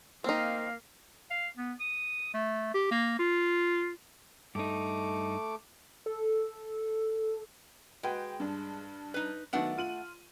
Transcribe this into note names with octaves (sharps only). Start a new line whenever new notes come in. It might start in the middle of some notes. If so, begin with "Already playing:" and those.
A#3 C4 D#4 F5
F5
B3
D#6
A3
G4
A#3
F4
G2 A3 D#4 D6
A4
G#3 F#4 B4 G5
G2 D4
D#4 B4
D#3 F#3 A3 B3 D4 F#5
F4 D#7 F#7